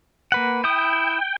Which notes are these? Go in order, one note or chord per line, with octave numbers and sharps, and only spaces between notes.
A#3 B4 F#5
E4 G5 D#6